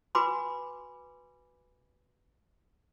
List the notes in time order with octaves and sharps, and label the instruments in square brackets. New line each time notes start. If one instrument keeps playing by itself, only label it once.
[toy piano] F#4 B4 G#5 B5 C6 D6